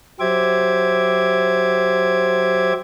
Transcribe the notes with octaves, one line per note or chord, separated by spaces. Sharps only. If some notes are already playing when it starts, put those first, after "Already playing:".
F#3 G4 C5 E5 D6 G#6